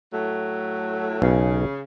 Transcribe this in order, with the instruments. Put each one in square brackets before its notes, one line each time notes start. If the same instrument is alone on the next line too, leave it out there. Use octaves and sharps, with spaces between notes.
[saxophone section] A2 F#3 A3
[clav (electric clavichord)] B1 [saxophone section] C#3